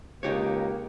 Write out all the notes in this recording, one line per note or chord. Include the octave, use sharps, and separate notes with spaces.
C#2 A#3 D#4 G4 C#5